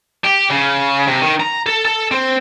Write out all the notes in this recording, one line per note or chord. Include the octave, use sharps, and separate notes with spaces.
G4
C#3
C3
D#3
A#5
A4
A4
C4